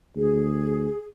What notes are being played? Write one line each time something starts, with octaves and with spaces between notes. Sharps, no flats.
D2 G#4